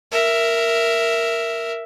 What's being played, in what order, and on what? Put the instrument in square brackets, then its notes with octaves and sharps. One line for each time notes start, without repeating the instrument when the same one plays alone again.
[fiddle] A#4 E5